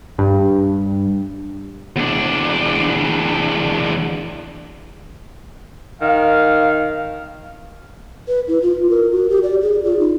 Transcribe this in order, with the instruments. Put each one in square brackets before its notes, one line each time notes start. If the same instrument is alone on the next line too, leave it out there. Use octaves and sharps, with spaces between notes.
[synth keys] G2
[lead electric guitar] E2 D4
[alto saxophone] D#3 [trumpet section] F5
[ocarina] B4
E4
F4
A#4
F#4
G4
D5
G#4
F4
D#4